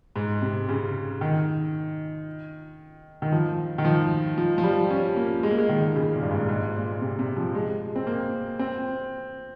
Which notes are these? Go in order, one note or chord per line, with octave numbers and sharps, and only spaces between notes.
G#2
C3
C#3
D#3
D#3
F3
D#3
F3
F3
F3
G3
C#4
A#3
G#3
A#3
G#3
D#3
C#3
A#2
G2
G#2
G#2
A#2
C3
C3
F3
G#3
C4
A#3
C4